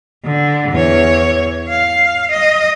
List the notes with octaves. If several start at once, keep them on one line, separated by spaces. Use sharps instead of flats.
D3
E2 C#5
F5
D#5